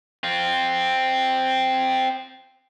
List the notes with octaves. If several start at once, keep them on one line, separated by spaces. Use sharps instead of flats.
C4 F4